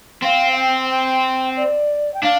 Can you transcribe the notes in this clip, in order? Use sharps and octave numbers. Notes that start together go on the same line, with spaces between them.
C4 F5
F5
G5
G5
D5
G5
D4 F5